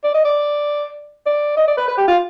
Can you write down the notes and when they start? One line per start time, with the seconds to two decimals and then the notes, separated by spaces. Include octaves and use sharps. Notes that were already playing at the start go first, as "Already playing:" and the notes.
0.04 D5
0.14 D#5
0.24 D5
1.26 D5
1.57 D#5
1.67 D5
1.77 B4
1.88 B4
1.97 G4
2.08 F4